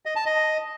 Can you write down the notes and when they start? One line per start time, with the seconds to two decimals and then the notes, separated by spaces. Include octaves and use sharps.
0.06 D#5
0.16 A5
0.26 D#5